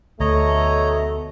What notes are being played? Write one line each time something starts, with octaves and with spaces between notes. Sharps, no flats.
D2 B2 A3 C#5 D#5 A#5